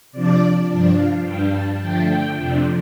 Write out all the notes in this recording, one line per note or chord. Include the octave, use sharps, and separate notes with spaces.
C3 F3 D4 D5
G2 F3 D4
F5
G2 G3 D4 G5
A5
D3 F3 A3 D4 G5
G5
F2 C3 F3 D4